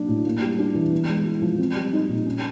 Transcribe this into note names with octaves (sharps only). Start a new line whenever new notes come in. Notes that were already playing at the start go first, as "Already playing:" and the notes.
Already playing: F#3 A#3 D4
A2
A#3
G3
D4
E3
B3
G#3
E4
F3
C4
G3
D#4
A#2
C#4